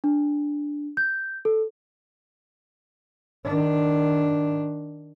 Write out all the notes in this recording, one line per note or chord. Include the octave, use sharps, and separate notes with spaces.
D4
G6
A4
D#3 D4